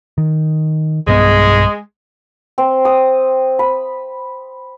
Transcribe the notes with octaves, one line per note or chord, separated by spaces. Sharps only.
D#3
B1 G2 G#3 B3
C4
D#6
B5